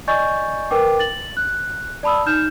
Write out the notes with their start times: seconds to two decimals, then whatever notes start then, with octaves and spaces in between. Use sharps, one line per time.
0.07 D5 D#5 G#5 C#6 G6 A6
0.71 A#4 B4 G5 D6
0.99 A6 F#7
1.37 F#6
2.03 D5 A5 B5 D#6 E6
2.26 D#4 F6 G6 E7